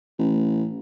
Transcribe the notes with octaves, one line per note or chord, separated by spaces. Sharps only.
A1